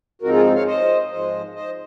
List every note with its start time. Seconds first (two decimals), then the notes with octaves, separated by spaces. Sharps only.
0.22 G#2 F3 C4 D#4 F#4 A#4
0.33 F4 G#4
0.55 C#5 F5
0.66 C5 D#5
1.10 G#2 F3 G#3 C5 D#5
1.55 C5 D#5